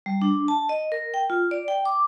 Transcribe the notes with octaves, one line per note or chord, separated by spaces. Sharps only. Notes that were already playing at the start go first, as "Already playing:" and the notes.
G3
D4
A5
D#5
A#4
G5
F4
D5
G5
D6